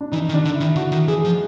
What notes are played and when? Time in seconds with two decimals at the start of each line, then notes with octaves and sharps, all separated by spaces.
0.01 D4
0.12 E3 D#4
0.29 D#3
0.34 D4
0.45 D3
0.55 D#3 E4
0.76 D3 F#4
0.92 D#3
1.08 E3 G#4
1.24 F3